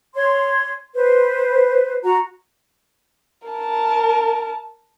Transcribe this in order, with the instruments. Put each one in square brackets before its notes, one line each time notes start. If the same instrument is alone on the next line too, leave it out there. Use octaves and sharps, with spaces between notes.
[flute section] C#5 C6
B4 C5
F#4 A#5
[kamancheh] A#4 A5